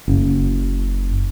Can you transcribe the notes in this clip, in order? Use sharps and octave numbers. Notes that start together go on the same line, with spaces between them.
F#1